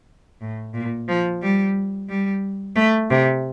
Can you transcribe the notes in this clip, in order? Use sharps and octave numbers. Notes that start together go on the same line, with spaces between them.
A2
A#2
F3
G3
G3
A3
C3